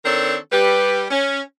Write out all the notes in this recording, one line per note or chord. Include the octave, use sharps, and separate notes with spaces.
D#3 C4 D4 A4 A#4 C#5
G3 G4 B4
C#4